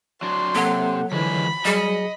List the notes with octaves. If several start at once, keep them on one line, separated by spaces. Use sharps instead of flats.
F#3 D4 C6
C3 F#3 A#3 A4 F#5
D3 E3 F3 G#3 G#4 B5
F#3 G3 G#4 D#5 C#7